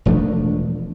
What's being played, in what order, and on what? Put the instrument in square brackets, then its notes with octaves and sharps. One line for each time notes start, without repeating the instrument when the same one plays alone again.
[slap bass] E1 F3 A3 D4